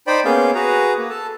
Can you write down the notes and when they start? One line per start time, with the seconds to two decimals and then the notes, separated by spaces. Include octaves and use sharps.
0.07 D#4 C5 D5 G5 B5
0.25 A#3 B3 C#4 G#4 F5 G6
0.55 F#4 G#4 B4 A#5
0.98 A#3
1.10 A4 A5